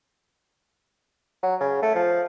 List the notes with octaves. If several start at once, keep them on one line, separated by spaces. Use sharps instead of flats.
F#3
C#3
A3
F3